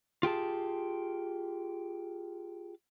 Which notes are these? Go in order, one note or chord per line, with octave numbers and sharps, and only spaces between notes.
F4 G4 G#4 A5